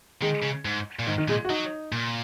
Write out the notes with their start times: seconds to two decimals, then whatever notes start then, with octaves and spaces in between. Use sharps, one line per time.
0.22 D#3 G#3
0.43 C#3
0.65 G#2
0.99 A#2
1.07 G#2 D#3
1.18 D#3
1.28 A#2 G#3
1.45 F#4
1.49 F#3 D#4
1.92 A#2